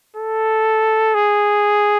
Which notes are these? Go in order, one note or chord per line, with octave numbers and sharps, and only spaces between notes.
A4
G#4